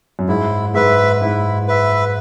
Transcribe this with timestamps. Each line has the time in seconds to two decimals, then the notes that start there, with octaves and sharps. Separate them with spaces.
0.19 F#2
0.28 G#2 E4
0.74 G#2 B4 E5
1.21 G#2 E4
1.68 B4 E5